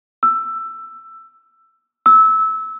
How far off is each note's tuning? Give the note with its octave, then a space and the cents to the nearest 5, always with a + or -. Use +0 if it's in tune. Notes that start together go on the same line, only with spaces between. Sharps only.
E6 +15
E6 -20